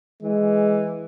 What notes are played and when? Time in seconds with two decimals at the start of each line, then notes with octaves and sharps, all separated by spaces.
0.23 E3 G#3